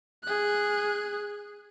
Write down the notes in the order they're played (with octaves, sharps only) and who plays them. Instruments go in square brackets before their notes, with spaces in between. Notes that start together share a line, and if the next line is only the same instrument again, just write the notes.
[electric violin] G#4 F#6